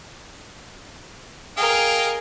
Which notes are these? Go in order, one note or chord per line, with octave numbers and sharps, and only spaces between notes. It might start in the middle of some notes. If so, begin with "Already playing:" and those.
G#4 A#4 D#5 F5 G5